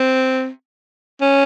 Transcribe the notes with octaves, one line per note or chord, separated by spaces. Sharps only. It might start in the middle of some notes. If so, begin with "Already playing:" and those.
Already playing: C4
C#4